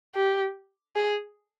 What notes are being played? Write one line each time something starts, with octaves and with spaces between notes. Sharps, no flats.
G4
G#4